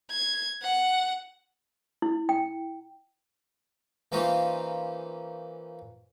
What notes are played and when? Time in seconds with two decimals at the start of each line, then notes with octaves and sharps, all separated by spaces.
0.11 G#6
0.63 F#5
2.02 E4
2.29 G5
4.12 E3 A#3 C4 C#4 D#4 F4